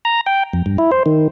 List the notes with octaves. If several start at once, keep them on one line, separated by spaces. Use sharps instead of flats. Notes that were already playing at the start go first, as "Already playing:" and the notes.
A#5
G5
F2
G2
E4
C5
D#3